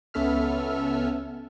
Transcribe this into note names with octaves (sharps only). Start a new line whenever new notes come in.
C#2 B3 C#4 A4 E5 F6